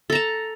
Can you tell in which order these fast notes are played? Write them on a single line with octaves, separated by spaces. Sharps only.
A4 A#5 A5